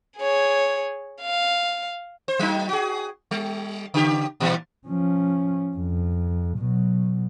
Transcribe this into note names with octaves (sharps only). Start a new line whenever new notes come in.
G#4 C#5
F5
C5
F#3 D#4
F#4 G#4
G3
C#3 G4
A#2 E3 G3
F3 C#4
F2
B2 F#3